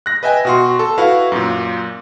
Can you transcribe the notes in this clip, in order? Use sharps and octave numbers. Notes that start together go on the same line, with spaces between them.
F#6 A#6
B4 D#5 E5 G5 G#5
B2 F#4 C6
A4
E4 F#4 B4 F5
F#2 A#2